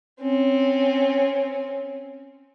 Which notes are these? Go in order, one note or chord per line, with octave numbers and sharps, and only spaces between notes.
C4 C#4